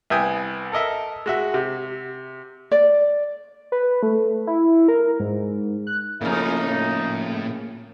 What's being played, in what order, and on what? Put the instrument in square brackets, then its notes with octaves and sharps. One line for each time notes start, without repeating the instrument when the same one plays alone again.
[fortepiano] C2 B3 E5 G5 G#5 D#6
A4 A#4 D#5 E5
G#3 F#4 E5
C3
[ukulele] D5
[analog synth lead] B4
A3
E4
A#4
G#2
F#6
[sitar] F2 C#3 [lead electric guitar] A2 [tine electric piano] A#3 F6 [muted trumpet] D#4